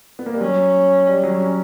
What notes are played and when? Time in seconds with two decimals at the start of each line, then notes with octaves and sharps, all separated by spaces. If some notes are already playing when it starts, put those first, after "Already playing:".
0.19 B3
0.26 A#3
0.34 G3
0.40 F#3 C#4
1.07 G3
1.23 F#3
1.41 C#4